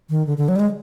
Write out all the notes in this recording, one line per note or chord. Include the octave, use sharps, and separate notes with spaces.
D#3
D3
D3
F#3
G3
G#3